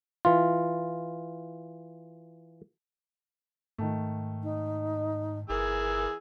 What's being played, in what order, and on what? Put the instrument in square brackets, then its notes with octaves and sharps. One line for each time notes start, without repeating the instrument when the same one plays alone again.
[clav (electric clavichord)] E3 F4
[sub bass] G#2 [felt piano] D#3 A3
[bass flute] D#4
[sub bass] G1 [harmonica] E3 G#4 E6 [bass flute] A#4